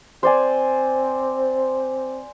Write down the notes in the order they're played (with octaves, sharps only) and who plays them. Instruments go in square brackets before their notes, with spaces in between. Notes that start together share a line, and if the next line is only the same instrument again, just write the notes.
[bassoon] C4 [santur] C5 D5 G#5